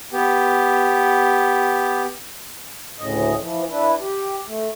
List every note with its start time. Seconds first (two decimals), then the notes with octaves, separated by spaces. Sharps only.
0.12 B3 G4
2.99 D2 A2 C#3 D#5
3.38 E3 F3
3.70 E3 D4 E4 B4
4.00 G4
4.47 A3